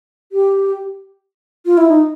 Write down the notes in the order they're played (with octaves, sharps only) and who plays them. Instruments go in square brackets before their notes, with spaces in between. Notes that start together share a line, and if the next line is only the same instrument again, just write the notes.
[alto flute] G4
F4
E4
D#4